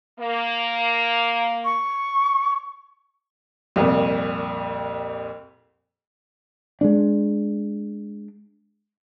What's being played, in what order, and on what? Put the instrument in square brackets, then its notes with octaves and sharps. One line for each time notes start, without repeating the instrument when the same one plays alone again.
[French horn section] A#3
[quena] C#6
[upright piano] C2 F2 A#2
[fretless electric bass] G#3 A3 D4